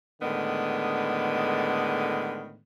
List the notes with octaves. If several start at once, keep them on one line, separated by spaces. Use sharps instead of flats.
A2 D3 D#3 G#3 B3